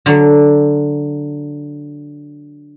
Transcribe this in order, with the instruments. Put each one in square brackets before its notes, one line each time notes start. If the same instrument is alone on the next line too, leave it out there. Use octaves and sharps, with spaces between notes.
[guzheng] D3 F#3